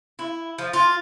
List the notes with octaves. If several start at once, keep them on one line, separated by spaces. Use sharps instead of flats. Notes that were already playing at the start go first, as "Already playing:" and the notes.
E4
F3
F4